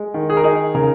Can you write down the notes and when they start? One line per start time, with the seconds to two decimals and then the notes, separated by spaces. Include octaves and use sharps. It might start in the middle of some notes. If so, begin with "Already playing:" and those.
Already playing: G#3
0.14 D#3
0.30 G#4
0.37 A#4
0.44 D#4 G#4
0.75 C#3 A#4